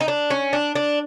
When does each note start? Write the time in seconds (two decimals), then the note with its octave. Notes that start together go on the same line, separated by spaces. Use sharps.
0.01 D#4
0.08 D4
0.30 C#4
0.53 D4
0.75 D4